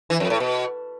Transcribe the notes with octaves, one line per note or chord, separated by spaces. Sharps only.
E3
F2
A2
B2